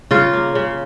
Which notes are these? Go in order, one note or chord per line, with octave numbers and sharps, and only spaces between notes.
C#3 F4
A#3
C#3